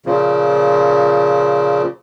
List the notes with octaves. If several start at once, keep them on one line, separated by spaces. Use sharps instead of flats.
A#2 C#3 F3